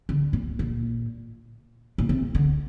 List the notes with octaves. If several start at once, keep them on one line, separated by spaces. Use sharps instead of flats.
D3
A#2
A#2
A#2
C3
D3